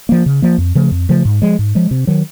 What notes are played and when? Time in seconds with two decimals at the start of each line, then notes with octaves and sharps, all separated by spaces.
0.09 F3 A#3
0.26 C#3
0.42 F3 A#3
0.58 F2
0.75 C#3 F3 A3
0.91 F2
1.09 C#3 F3 A3
1.25 G#2
1.42 F3 G#3
1.59 G#2
1.75 F3 G#3
1.91 C3
2.07 D#3 F#3